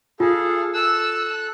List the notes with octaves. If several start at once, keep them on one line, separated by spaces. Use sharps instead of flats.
F4 G#4 A4 F5
A4 E6 F#6